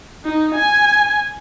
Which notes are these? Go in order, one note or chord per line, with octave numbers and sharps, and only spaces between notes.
D#4
G#5